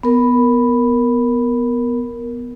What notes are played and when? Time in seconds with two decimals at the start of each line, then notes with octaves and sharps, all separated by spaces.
0.03 B3 A#4